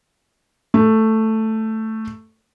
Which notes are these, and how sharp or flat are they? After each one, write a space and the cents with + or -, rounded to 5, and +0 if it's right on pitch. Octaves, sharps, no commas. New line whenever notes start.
A3 +5